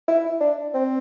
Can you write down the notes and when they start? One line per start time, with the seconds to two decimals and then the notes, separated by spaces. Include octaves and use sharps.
0.08 E4
0.41 D4
0.74 C4